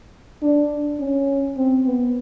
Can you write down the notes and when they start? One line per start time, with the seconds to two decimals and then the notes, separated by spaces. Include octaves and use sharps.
0.42 D4
0.99 C#4
1.57 C4
1.86 B3